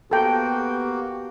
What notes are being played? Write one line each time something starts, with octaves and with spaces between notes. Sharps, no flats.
A#3 B3 F#4 G4 A4 G5